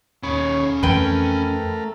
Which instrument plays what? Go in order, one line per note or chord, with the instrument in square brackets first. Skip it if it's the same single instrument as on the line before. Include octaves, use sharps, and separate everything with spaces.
[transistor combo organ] D#2 C#5 [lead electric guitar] C#4 B5
[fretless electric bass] F2 E3 [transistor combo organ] A3 A#4 [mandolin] B4 G5